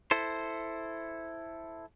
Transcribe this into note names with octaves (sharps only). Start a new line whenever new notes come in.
E4 A4 C5